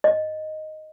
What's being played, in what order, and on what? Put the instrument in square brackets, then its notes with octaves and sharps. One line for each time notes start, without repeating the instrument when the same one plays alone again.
[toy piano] D#5